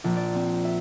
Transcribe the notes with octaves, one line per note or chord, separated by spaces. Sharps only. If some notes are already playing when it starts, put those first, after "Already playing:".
A#1
D5
C4
E5